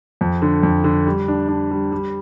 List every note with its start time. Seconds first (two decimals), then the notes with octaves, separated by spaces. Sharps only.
0.21 F2
0.42 D3
0.63 F2
0.84 D3
1.07 G3
1.28 D4
1.48 D4
1.71 G3
1.92 G3